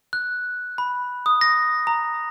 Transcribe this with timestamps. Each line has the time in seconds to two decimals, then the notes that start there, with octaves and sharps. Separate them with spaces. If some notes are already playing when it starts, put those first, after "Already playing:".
0.13 F#6
0.78 B5
1.26 D#6
1.41 A#6
1.87 A#5